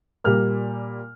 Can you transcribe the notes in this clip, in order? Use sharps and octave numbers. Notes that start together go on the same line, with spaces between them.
A#2 G3 A#3 F6